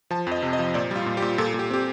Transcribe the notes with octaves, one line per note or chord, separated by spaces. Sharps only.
F3 A5
F2 D#5
C3
D#5
F3
A#2 D5
G3 F4
A#2
G4
A#2
A#2 A4
A#2 G4
C4 G4